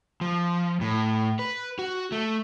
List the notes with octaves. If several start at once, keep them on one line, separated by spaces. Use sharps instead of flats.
F3
A2
B4
F#4
A3